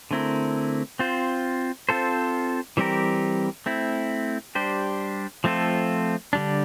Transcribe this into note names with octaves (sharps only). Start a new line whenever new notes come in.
D3 A3 C4 E4 A#4
C4 F4 C5
C4 F4 A4 C5
E3 G3 C4 G4 A#4
A3 C4 E4
G3 D4 G4 C5
F3 A3 C4 F4 A4
D3 G3 D4